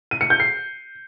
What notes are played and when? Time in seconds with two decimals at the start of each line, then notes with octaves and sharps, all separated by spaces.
0.11 D#7
0.21 C#7
0.30 G6
0.40 C7